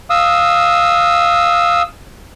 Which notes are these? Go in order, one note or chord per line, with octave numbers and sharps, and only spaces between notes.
F5 D#6 E6